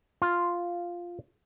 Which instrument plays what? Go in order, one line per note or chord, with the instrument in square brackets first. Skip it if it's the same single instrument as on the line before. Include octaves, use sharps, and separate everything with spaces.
[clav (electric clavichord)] F4